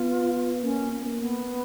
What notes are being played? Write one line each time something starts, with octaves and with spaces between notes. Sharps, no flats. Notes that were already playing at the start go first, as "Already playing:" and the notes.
Already playing: B3 F4
A#3 C#4
A#3
C#4
B3